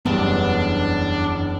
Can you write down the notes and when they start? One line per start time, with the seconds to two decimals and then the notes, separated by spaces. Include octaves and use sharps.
0.06 F#1 E2 G2 B3 D4